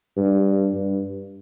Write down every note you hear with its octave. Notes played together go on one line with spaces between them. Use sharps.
G2
G2